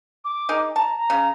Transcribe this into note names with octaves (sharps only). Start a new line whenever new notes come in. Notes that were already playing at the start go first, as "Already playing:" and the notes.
D6
D#4 G#4 A#4
A5 A#5
A#5
C#3